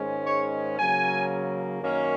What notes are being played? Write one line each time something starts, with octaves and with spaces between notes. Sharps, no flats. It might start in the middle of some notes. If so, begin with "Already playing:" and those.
Already playing: G#2 D#3 G#3 C#4
C#5
C#3 F#3 A#3 G#5
F#2 D#3 A#3 C#4